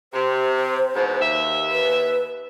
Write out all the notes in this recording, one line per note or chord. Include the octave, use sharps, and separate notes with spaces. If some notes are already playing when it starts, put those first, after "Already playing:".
C3 C5
E2 G#2 B2
D#2 E5
B4